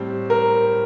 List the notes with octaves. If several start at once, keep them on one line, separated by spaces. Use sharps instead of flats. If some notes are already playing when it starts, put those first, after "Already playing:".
Already playing: A2 G3 C4 C5
A#4